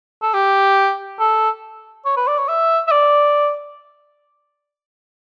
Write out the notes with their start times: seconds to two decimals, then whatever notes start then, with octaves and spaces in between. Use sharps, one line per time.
0.22 A4
0.34 G4
1.19 A4
2.05 C#5
2.16 B4
2.27 D5
2.38 C#5
2.48 E5
2.87 E5
2.91 D5